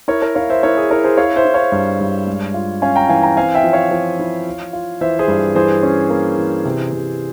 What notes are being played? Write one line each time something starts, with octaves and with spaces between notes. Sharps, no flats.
E4 A#4 C#5
A#4 C#5
E4 C#5 F5
C5 E5
E4 A#4 C#5
G#4 C5
E4 A#4 C#5
G#4 C5
E4 C#5 F5
C5 E5
E4
C#5 F5
G2
G2
G#3
F4
C#4 F5 G#5
G5 A#5
E3 F5 G#5
G5 A#5
C4 F5 G#5
E5 G5
F3
C#5 F5
F3
E4
F4
F4
E3 C5 E5
G#4 C5
G2
E3 G#4 C5
C#4
A#3
E3
C3
C3